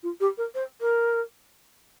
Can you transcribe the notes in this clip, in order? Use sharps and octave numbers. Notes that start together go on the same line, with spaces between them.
F4
G4
A#4
C5
A#4